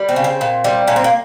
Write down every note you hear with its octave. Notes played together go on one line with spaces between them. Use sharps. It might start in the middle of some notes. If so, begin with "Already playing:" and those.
Already playing: G3
C4
C#3
C4
A#2
G3
A#2 C#4
C4
A#3